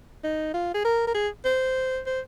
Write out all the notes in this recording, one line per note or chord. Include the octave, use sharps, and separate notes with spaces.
D#4
F4
G#4
A#4
A#4
G#4
C5
C5